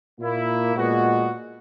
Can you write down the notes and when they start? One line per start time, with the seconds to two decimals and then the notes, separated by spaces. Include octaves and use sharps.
0.19 A#2 A#3 E4
0.75 A#2 G#3 B3 F#4